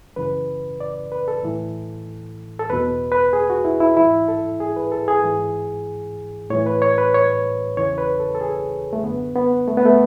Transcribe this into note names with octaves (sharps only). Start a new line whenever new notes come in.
F#2 C#3 E3 B4
D5
B4
A4
A2 E3
A4
E2 B2 B4
B4
G#4
F#4
E4
E4
G#2 E3 E4
A4
G#4
B4
A4
G#4
G#2 E3
A2 E3 C#5
B4
C#5
B4
C#5
E2 C#3 E3 C#5
B4
A4
A4
G#4
A3
F#2 D3 B3
B3
A3
B3
A3